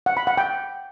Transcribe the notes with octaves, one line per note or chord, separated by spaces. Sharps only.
F#5
B5
F#5
G5